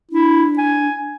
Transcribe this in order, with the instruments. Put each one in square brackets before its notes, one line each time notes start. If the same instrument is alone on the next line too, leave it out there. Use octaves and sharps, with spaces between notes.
[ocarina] D4 [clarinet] E4
[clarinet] G#5